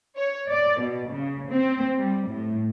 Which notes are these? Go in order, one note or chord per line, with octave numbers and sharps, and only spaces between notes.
C#5
D5
B2
C#3
C4
G3
A2